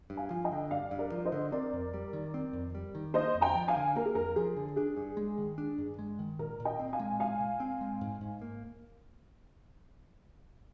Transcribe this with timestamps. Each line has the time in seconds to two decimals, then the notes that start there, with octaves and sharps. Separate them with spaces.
0.10 G2
0.17 F5 G#5
0.31 F3
0.44 D#5 G5
0.52 D3
0.71 G2 D5 F5
0.91 G2
0.98 A#4 D5
1.12 F3
1.25 C5 D#5
1.32 D3
1.52 C4 A#4 D5
1.73 F2
1.94 G3
2.13 D#3
2.34 C4
2.53 F2
2.75 G3
2.95 D#3
3.14 A#3 C5 D#5
3.35 F2
3.41 G5 A#5
3.55 F3
3.68 F5 G#5
3.76 D3
3.96 A#3 A#4
4.05 G#4
4.15 F2 A#4
4.36 F3 G#4
4.57 D3
4.76 D4 G#4
4.97 G2
5.17 G#3
5.38 D#3
5.58 D4
5.78 G2
5.99 G#3
6.19 D#3
6.39 A#2 A#4
6.60 A#2
6.65 D#5 G5
6.79 C4
6.93 F5 G#5
6.99 G#3
7.20 A#2 F5 G#5
7.41 A#2
7.60 C4
7.81 G#3
8.01 G#2
8.21 G#2
8.42 A#3